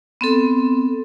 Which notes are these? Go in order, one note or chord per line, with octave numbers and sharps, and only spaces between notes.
B3 C4 A4